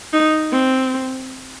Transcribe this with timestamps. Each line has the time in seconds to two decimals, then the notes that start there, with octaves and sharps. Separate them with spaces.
0.13 D#4
0.52 C4